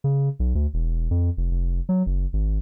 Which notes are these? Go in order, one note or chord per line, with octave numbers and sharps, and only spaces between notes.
C#3
B1
D2
E1
F2
F1
F1
F#3
F#1
G#1